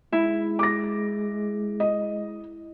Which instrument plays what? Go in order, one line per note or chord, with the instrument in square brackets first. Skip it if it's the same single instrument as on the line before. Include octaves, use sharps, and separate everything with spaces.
[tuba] G#3 [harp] E4
[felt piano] D6 A#6
D#5